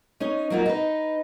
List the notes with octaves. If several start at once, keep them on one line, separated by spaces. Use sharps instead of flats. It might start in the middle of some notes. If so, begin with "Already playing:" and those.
C#4 D#4 C#5
F#3 G3 A#3 D#4 F4 F#4
D#4 B4